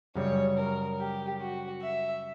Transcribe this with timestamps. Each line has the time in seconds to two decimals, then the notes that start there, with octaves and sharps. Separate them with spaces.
0.15 F#2 C#3 G3 C#5
0.57 A#4
0.99 G4
1.41 F#4
1.82 E5